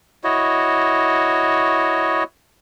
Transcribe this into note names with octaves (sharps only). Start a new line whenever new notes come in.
E4 F#4 C#5 D#5